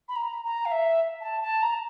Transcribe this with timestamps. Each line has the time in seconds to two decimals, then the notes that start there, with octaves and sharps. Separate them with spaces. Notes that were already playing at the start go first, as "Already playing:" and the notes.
0.09 B5
0.16 A#5
0.45 A#5
0.65 F5
0.71 E5
1.21 A5
1.41 A5
1.62 A#5